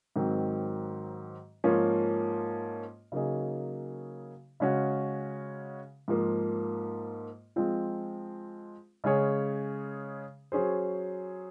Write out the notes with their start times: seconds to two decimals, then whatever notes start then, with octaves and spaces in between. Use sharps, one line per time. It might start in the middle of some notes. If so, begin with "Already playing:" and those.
0.16 G#2 D#3 F#3 C4
1.64 G#2 F3 A#3 C#4
3.12 C#3 F#3 A#3 D#4 G#4
4.60 C#3 G#3 C#4 F#4
6.08 G#2 F3 A#3
7.56 F3 G#3 C4 F4
9.04 C#3 G#3 C#4 G#4 C#5
10.52 F#3 C#4 G#4 C5